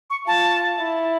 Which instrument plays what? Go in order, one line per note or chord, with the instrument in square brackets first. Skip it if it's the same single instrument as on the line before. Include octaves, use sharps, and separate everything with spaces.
[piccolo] C#6
[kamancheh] F4 [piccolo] A5
[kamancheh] E4